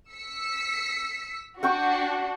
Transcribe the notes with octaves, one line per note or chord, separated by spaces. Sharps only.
E6 B6 C#7
D4 F#4 F#5 G5 C#6